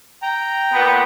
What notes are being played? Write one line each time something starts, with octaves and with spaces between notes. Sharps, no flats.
G5 A#5
A#2 B3